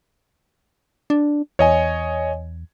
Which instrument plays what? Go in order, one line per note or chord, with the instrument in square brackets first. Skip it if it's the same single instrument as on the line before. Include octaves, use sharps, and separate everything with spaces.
[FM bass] D4
[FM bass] E2 [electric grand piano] C#5 D#5 G#5